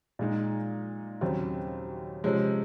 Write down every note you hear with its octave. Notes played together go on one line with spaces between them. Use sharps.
A#2 G#3 D#4
D#2 C#3 F#3 C4
C3 F3 G#3 C#4 G#4